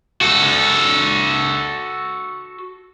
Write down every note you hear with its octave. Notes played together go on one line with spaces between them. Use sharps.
F#4 A4